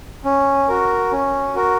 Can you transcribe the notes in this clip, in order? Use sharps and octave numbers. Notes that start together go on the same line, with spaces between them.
C#4
F#4 A#4
C#4
F#4 A#4